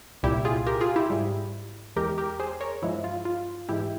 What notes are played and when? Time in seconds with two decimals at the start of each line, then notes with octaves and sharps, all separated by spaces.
0.23 C2 A#2 G3 E4 G4
0.45 F4 G#4
0.67 G4 A#4
0.81 F4 G#4
0.96 E4 G4
1.10 G#2 G3
1.96 E2 E3 G#3 G4 A#4
2.18 G4 A#4
2.40 G#4 C5
2.60 A#4 C#5
2.82 G2 F3 G#3 E4
3.04 F4
3.25 F4
3.69 G#2 E3 G#3 E4 G4